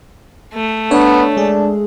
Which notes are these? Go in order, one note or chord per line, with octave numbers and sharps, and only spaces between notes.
A3
B3 D4 C#5
G#3 D4 G#4